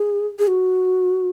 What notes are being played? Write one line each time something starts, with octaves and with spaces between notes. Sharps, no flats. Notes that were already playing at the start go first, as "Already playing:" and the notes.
Already playing: G#4
G#4
F#4